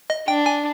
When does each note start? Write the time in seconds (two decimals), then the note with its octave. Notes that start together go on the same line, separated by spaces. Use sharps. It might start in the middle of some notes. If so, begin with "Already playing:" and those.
0.10 D#5
0.28 D4 G5
0.46 G#5